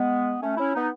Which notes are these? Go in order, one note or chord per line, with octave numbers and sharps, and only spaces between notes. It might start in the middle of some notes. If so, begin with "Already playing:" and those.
Already playing: G#3 B3
A3 C#4
C#4 E4
B3 D#4